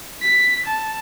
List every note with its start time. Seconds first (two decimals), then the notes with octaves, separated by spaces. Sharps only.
0.22 B6
0.66 A5